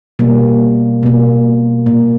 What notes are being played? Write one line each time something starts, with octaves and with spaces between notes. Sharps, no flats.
B2 G3 A#3
B2 A#3
A#2 A#3